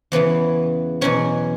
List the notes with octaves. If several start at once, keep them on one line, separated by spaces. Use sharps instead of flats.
E2 C#3 E3 B3
E2 B2 F#3 C#4